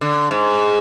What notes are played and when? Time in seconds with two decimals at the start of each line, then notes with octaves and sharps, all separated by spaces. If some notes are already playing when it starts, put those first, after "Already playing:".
0.01 D3
0.31 G#2